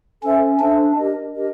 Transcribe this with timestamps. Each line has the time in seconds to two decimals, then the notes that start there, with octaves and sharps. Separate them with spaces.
0.22 C#4 A4 C5 E5
0.59 D4 A4 C5 E5
0.95 D4 G4 A#4 D#5
1.33 D4 G4 A#4 D#5